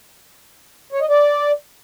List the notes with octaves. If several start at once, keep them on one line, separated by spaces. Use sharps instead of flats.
C#5
D#5
D5